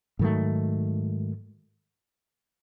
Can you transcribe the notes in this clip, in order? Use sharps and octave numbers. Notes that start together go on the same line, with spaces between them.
G#2 D#3 F#3 A3